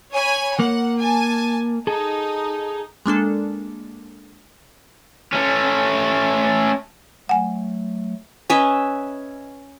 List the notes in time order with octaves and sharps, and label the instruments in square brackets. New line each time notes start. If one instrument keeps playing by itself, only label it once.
[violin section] C#5 G#5 B5
[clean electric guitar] A#3 [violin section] F#5
[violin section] G#5 A5
[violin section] D#4 [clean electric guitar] G#4 A4
[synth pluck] G#3 A#3 D4 A4
[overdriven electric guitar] A3 C#4
[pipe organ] F#3 A3 [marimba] F#5 G#5
[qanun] C#4 B4 D#5 E5